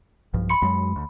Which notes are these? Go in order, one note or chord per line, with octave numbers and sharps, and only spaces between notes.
B1 G2 F3
B5 C6 C#7
F#2 F#3 G#3
D2